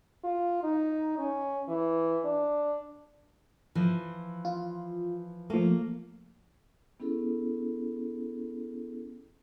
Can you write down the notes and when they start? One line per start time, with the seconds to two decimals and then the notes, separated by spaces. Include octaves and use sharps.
0.24 F4
0.63 D#4
1.18 C#4
1.68 E3
2.24 D4
3.75 E3 F3
4.45 F4
5.50 F3 A3 A#3
7.00 B3 C#4 E4 G#4 A4